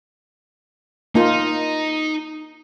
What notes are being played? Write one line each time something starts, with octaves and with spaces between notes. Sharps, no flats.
A#3 D#4 F4